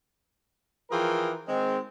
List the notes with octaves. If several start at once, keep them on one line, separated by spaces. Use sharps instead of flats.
E3 F3 F4 G#4 A#4 G5
D#3 G#3 C4